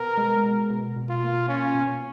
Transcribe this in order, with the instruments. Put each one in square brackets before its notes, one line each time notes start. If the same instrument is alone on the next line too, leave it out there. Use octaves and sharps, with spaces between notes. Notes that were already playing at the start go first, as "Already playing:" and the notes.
Already playing: [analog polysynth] B2 B3 [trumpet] A#4
[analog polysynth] G#3
B2
B2
B2
[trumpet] F4
[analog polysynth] A#3
[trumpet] C#4 [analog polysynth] F4
[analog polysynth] B2